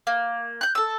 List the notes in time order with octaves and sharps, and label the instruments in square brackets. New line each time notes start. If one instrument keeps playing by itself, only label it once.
[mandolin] A#3
F#6 G6
A4 E6